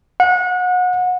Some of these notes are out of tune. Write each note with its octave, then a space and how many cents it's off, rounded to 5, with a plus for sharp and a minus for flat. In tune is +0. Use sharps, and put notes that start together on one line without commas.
F#5 -30